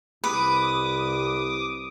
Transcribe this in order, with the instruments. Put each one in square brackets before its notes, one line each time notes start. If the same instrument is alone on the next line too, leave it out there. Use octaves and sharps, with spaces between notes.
[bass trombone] C2 [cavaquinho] B4 [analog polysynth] D6 D#6